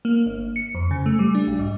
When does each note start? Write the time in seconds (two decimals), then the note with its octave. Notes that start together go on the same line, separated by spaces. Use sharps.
0.05 A#3
0.26 G1
0.56 C#7
0.75 F2
0.91 C#3
1.06 A3
1.19 G3
1.35 D4
1.47 B1
1.59 G#2